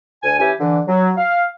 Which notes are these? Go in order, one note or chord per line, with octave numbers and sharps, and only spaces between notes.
D2 G#5
E3 C#4 E4 G4 G#5
D3 E3
F#3
F5